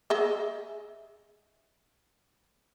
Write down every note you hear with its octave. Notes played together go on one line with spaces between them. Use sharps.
G#4 D#5 E5